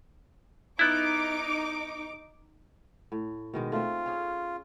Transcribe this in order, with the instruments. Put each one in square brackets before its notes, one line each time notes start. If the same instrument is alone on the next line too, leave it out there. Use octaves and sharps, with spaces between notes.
[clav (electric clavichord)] B3 E4 [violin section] D#4 D6
[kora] A2
B2 D#3 G#3
[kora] A3 C4 [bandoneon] F4
[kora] C#4 G#4